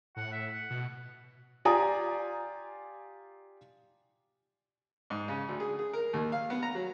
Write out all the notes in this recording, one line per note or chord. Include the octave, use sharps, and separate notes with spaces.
A2 F#5
E5
F#5
B2
F4 G4 D5 G#5 A#5 D#6
G#2
C#3
D2
G#4
G#4
A#4
D#2
F5
B3
A#5
F#3